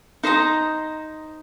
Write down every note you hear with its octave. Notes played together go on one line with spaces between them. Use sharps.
D#4 C5 D#5 A#5